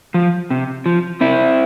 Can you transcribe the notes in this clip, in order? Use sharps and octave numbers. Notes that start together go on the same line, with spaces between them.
F3
C3
F3
C3 C4 E4